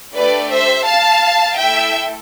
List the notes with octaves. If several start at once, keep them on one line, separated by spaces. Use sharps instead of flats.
A3 D4 G4 B4 D5
C5 E5
F5 A5
A3 E4 A4 E5 G5